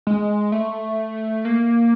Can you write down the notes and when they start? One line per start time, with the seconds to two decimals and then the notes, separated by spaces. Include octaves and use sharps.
0.07 G#3
0.52 A3
1.45 A#3